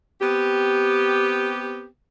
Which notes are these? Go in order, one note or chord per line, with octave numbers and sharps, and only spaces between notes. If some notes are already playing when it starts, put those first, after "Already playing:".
B3 C4 G4